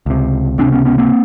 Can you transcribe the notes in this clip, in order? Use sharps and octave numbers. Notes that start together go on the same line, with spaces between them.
C#2 C3
C#2 C3 C4 D4
B3 C#4
B3 C#4
A#3 C4